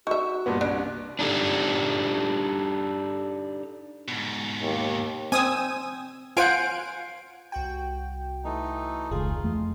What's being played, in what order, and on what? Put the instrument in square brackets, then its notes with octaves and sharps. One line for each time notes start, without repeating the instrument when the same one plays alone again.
[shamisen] D#4 E5 [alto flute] F#4 [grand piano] C#6
[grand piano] G2 A#2 B3
[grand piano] C2 D7 [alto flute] C#4 [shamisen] D4
[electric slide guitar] D4 D#4 G4 A4
[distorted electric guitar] G#2 B2
[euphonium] D#2
[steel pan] C4 [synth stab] G#5 D#6 E6
[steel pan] F4 C5 F#5 [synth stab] F5 G#5 D7
[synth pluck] C2 F#4 G5
[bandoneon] E3 A3 D#4
[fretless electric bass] F1 C#2 [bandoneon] F4 [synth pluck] G#4
[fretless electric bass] F2 E3 A3